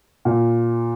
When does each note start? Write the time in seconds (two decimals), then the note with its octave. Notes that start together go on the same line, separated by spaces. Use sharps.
0.25 A#2